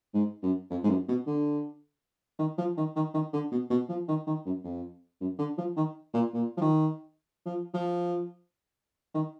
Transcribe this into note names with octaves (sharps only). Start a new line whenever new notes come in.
G#2
F#2
F2
G#2
F#2
B2
D3
D#3
F3
D#3
D#3
D#3
D3
B2
B2
F3
D#3
D#3
F#2
F2
F#2
D3
F3
D#3
A#2
A#2
F3
D#3
F3
F3
D#3